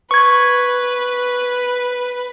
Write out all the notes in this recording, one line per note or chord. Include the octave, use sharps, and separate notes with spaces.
B4 C#6 G#6